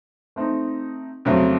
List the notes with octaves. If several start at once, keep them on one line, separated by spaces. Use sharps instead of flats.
A3 C4 D#4
F2 C#3 F#3 A3 C4